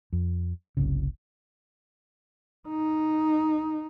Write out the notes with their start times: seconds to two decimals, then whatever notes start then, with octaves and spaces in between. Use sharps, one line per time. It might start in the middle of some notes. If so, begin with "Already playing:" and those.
0.13 F2
0.77 F#1 C2 F#2 C#3
2.69 D#4